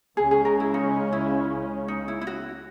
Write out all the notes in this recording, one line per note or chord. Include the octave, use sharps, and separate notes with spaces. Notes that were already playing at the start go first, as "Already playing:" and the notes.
C#2 C#3 G#3 C#4 G#4
G#4
A#4
E4
D#4
E4
D#4
E4
E4
F#4